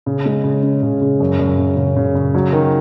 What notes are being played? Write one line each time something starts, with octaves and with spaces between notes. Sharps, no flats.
C#3
G#3
C#3
C#4
C#3
C#3
F#2
F#2
C#3
C#3
C#3
C#3
F#3
D#3